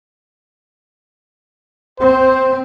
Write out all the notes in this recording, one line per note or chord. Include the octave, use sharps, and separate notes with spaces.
C4 C5